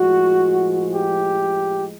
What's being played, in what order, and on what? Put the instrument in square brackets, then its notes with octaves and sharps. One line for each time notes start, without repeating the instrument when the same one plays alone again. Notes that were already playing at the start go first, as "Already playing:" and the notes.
Already playing: [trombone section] A2 F3 G#3 F#4
G4